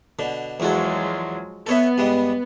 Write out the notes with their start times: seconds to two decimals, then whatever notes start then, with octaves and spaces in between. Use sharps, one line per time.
0.19 B2 D3
0.60 E2 F3 F#3 G#3 F#4 A4
1.67 B3 A4 C#5 E5
1.98 G2 G3 G#3